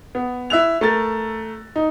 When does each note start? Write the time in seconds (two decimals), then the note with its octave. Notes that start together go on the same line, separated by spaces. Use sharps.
0.15 B3
0.50 E4 E5 E6 F#6 F7
0.81 A3 A#4 A6
1.76 D#4